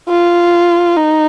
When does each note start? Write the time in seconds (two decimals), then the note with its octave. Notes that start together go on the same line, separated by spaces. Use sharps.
0.09 F4
0.97 D#4